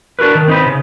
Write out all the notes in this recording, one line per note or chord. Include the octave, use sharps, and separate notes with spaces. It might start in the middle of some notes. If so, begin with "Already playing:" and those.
D4 F#4 A#4 B4
D#3
C4 D#4 B4
C#3